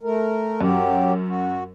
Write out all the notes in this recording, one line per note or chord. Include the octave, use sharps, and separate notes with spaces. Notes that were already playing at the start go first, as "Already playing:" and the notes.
A3 A#4
F#2 F#3 G4
F#4